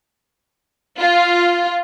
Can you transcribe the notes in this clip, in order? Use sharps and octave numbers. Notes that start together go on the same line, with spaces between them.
F4